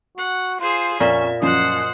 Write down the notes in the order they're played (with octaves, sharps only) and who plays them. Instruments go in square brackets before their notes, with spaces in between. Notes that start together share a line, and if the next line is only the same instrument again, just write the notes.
[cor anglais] F#4 [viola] F#5
[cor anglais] F4 [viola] G#4 C5
[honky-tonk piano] F2 [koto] A#2 [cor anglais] C#4 [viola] E5
[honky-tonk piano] F#2 F3 C#4 [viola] C5 F#5 [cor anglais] D#5